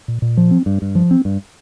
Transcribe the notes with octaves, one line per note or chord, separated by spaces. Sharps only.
A#2
A#2
F3
C4
G2
G2
F3
C4
G2